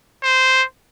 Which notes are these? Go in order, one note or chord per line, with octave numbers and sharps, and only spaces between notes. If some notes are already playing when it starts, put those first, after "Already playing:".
C5